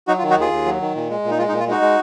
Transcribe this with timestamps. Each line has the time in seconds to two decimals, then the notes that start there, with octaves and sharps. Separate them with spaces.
0.08 F#3 D#4 F#4
0.18 F4
0.22 D#3
0.30 D#4 F#4
0.38 D#2 F4 G#4
0.51 D#2
0.66 F#3
0.81 D#3
0.96 A#2
1.10 G#3
1.24 A#2
1.30 D#4
1.38 G#3 F4
1.49 D#4
1.52 A#2
1.60 F4
1.68 G#3 D#4 F#4
1.82 G#3